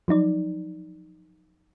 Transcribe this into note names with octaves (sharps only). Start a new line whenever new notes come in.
F3 F#3 D#4 D5